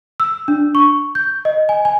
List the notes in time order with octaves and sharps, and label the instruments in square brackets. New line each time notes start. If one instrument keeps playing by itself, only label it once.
[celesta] E6
D4
C#6
G6
D#5
G#5
G#5